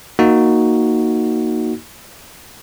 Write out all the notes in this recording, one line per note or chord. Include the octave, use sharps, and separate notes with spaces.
A#3 D#4 F#4